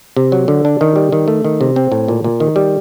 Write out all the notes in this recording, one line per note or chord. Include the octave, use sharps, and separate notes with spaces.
C3
F#3
D3
D4
D#3
G3
D#3
A3
D#3
C3
C4
A2
A#2
A#2
D#3
G3